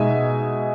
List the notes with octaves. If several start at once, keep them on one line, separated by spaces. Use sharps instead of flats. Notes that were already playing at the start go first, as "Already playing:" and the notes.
Already playing: B2 G#3 D#4 E5 G#5